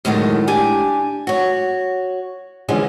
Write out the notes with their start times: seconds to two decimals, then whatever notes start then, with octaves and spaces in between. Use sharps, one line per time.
0.05 F#2 A2 D3 D#3 G#3
0.48 D4 G4 G#5
1.27 F#4 C#5
2.68 D3 E3 F3 G#3 C#4